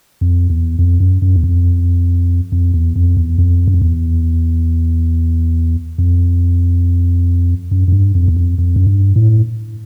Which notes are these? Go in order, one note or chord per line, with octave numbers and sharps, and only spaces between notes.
F2
E2
F2
F#2
F#2
E2
F2
F2
E2
F2
E2
F2
F#2
F2
E2
F2
F#2
F#2
G2
F2
E2
F2
F2
F#2
G2
A2